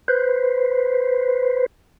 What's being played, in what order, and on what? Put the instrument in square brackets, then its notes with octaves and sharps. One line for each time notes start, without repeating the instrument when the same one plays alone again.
[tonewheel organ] B4 C5